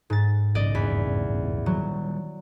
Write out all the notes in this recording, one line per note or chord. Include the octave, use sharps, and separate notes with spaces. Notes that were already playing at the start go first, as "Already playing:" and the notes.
G#2 A6
A#1 G2 C#3 D5 D#5
E2 B6
D#3 F#3 G3